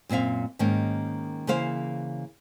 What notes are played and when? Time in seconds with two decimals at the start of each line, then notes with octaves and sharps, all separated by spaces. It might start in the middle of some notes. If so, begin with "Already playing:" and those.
0.09 F#2 A#2 C4 E5 F5
0.59 G#2 D#3 A#3 C#4
1.47 C#3 E3 A#3 C5 F5